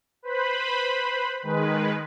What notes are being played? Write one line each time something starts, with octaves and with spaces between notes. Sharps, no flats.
B4 C5 B5
D#3 G#3 B4